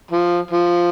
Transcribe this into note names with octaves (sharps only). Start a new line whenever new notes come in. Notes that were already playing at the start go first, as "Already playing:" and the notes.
F3
F3